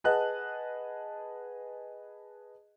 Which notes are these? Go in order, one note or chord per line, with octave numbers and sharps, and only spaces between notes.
G#4 B4 D#5 F#5 A5 F#6